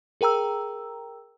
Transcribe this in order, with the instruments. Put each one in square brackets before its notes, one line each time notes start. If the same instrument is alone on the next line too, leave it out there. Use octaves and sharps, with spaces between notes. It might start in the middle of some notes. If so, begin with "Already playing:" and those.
[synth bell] G#4 A#4 G5 A#5 E6